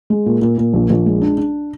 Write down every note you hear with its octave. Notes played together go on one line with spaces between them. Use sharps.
G#3
A#2
A#2
A#2
A#1
A#1
G#3
D4
D4